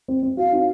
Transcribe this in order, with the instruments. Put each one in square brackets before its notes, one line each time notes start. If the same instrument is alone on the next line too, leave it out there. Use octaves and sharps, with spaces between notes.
[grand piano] C4
C4
[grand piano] F#4 [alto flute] F5
[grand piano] D#4